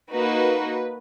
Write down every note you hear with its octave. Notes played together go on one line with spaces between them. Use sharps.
A#3 D#4 F#4 B4